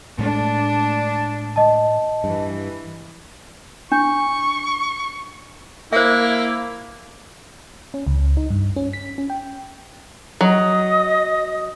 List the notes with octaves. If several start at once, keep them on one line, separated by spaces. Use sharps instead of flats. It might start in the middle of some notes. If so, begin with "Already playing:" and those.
A2 G#3 A3 D4
D#5 A5
G2 E3
D4 C#6
A#3 E4 C5 E5
C#4
C#2
D#4
G2
C#4
B6
C#4
G5
F#3 D#5 D#6